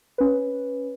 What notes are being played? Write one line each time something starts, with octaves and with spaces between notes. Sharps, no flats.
C#4 B4